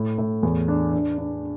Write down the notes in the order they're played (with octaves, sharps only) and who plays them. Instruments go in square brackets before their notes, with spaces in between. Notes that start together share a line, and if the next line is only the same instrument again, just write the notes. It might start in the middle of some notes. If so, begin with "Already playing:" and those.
Already playing: [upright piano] A2
A2
E2
D4
D4
D4